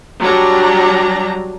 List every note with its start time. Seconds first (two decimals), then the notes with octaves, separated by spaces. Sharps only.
0.21 F#3 G3 D4 A#5